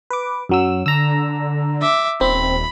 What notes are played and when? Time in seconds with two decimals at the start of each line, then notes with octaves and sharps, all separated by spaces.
0.10 B4 D6
0.49 F#2 F#3 E6
0.86 D3 A#5 E6
1.81 E5 D6
2.21 D#1 C4 B5